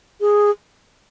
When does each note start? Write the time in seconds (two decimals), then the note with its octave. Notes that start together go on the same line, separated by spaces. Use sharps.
0.21 G#4